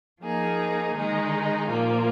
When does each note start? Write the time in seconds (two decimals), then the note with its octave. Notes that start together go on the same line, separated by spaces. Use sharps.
0.24 F3 A#3 D#4 G#4
0.96 D#3 G#3 D#4 G#4
1.68 A#2 F3 A#3 F4